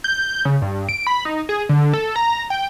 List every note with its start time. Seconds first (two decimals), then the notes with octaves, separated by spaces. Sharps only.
0.04 G6
0.45 C#3
0.62 G2
0.89 D7
1.07 B5
1.25 D#4
1.49 G#4
1.69 D3
1.94 A4
2.16 A#5
2.50 G5